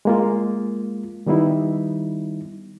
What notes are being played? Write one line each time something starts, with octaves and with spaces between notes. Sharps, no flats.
G#3 A#3 F4
D#3 G3 B3 D#4 E4